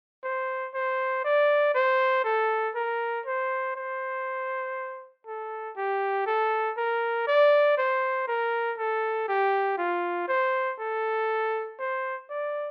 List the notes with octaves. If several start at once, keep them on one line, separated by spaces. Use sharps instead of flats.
C5
C5
D5
C5
A4
A#4
C5
C5
A4
G4
A4
A#4
D5
C5
A#4
A4
G4
F4
C5
A4
C5
D5